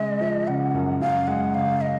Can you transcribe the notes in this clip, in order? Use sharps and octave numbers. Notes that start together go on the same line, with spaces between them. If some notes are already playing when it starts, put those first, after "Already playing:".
Already playing: C#3 G#3 D#5
F3
C#3 F#5
F#2
F#2 F5
G#3 F#5
C#3 F5
D#5